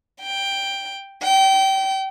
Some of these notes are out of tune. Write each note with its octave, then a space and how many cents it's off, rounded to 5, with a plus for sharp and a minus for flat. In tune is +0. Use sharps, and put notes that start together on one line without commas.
G5 +5
G5 -25